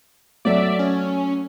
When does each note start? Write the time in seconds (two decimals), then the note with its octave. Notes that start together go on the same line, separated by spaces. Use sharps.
0.45 F#3 A3 D5 E5
0.79 C#4